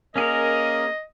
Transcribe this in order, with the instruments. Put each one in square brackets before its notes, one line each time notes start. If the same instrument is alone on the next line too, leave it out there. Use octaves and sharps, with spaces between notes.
[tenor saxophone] A#3 [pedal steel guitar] C#4 G#4 A#4 [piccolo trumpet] D#5